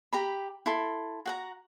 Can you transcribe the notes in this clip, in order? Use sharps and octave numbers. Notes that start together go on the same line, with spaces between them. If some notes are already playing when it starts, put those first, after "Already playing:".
G4 A#5 B5
E4 A4 C6
F#4 F#5 A#5